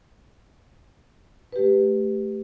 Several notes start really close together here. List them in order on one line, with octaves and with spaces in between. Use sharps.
B4 G4 A3